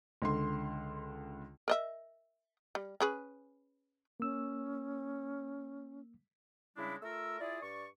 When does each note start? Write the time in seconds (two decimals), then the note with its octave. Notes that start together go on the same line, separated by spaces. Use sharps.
0.22 C#2 D3 C6
1.68 A#4 D#5 E5
2.75 G3
3.00 C#4 G#4 B4
4.20 A#3 C#4 E6
6.76 C#3 G3 G#3 D4 E4
7.02 A3 F4 A#4 E6
7.40 E4 F4 G#4 D5
7.61 G2 D5 C#6